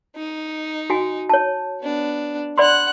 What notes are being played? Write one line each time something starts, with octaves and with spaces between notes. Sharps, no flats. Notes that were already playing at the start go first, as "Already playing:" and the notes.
D#4
F#4 G#5
C#5 A5
B3 D4
D5 F#5 B5 C6 F#6